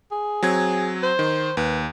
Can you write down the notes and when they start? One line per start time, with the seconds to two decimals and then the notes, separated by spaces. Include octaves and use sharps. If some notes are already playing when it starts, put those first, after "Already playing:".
0.11 G#4
0.43 F#3 C4 G#6
1.03 C5
1.19 D#3
1.57 D#2 B4